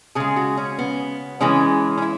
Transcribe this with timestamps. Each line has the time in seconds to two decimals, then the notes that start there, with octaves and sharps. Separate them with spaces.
0.15 C#3 G#3 G#4
0.36 F#4
0.57 C#4
0.79 B3
1.40 C#3 E3 G#3 C#4
1.98 C#4
2.02 E4